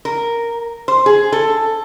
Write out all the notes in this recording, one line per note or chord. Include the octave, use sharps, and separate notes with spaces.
A#4
C5
G#4
A4